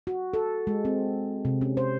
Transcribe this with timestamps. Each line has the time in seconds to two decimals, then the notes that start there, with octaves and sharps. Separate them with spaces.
0.07 F#4
0.34 A4
0.67 G#3
0.85 C4
1.45 C3
1.61 C#4
1.77 C5